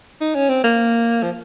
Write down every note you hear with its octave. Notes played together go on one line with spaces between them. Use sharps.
D#4
C#4
C4
A#3
F3